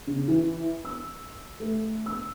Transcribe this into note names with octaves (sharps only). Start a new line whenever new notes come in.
C#3
E3
E6
A3
E6